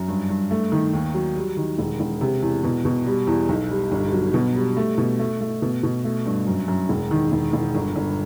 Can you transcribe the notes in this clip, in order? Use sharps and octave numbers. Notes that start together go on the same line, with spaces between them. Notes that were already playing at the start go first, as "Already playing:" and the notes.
Already playing: F#2
G2
G2
A3
D#3
D#2
F#3
G3
D#3
E1
E1
C3
E2
B2
B2
G3
E2
B1
G3
G1
F#3
B2
G3
A3
B2
A3
A3
B2
B2
A3
G2
F#2
F#2
E1
D#3
E1
E1
G1
G1